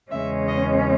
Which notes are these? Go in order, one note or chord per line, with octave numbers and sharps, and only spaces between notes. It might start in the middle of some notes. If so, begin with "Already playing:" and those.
E2 C#3 G#3 C#4 E5
D#5